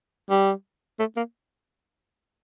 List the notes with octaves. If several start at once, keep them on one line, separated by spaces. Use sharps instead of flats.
G3
A3
A#3